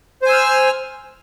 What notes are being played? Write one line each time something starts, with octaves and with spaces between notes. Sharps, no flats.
C5 G#5 E6 F6